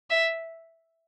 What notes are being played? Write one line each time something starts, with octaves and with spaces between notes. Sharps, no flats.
E5